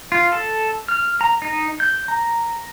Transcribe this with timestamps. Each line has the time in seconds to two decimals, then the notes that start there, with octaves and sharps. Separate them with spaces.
0.12 F4
0.32 A4
0.88 F6
1.21 A#5
1.42 D#4
1.80 G6
2.08 A#5